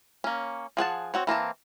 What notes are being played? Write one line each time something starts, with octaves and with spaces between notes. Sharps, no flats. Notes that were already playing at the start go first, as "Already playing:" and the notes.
A#3 C#4
F3 G#4 F#5 A5
C4 F#4 C#5
E3 A#3 C4 A5